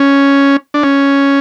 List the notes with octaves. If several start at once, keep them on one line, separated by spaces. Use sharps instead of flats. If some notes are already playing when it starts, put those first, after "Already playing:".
Already playing: C#4
D4
C#4